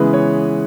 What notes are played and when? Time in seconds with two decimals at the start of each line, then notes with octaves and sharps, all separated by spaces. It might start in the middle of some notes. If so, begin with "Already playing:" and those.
Already playing: C#3 E3 G#3 B3 B4
0.13 C#5